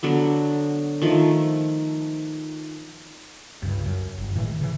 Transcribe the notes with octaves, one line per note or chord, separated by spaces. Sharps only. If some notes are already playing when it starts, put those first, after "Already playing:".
D3 F#3 B3
D#3 F3 A3
C#2 G2
F#2
G1
A2 D#3 E3 G#3
C#3 E3